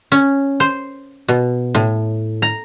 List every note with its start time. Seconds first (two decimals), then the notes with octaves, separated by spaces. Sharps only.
0.12 C#4
0.60 C5
1.28 B2
1.75 A2
2.42 A#5